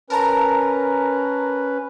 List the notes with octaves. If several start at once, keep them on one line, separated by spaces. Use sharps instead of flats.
C#4 A#4 B4 A5 A#5